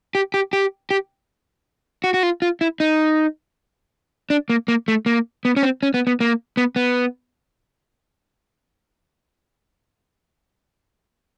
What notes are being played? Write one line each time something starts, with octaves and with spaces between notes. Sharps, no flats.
G4
G4
G4
G4
F#4
F#4
F4
F4
E4
D#4
D4
A#3
A#3
A3
A#3
B3
C#4
C4
C#4
B3
B3
A#3
B3
B3